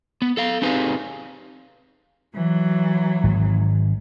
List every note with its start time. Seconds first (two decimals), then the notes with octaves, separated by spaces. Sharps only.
0.22 B3
0.37 A4 F5
0.62 C4 D#4 G4 G#4 B4 F5
2.35 E3 F#3
3.24 G#1 G#2